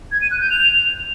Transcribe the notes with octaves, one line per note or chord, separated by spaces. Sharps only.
G#6
D#7
F#6
G6
F7